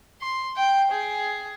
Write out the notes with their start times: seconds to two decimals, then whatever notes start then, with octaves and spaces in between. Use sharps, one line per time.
0.21 C6
0.57 G5
0.91 G#4